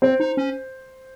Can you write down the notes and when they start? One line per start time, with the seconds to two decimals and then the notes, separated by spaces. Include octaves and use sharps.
0.02 C4 C5
0.20 D#4
0.37 C#4